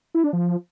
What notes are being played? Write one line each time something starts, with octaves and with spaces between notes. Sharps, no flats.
E4
D4
F3